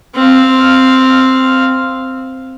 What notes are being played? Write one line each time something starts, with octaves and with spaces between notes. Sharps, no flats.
C4 F5